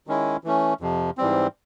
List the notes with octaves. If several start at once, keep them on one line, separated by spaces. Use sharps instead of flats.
D#3 G#3 C#4 E4
E3 A3 C#4
F2 C3 F3
G#2 E3 G3 C4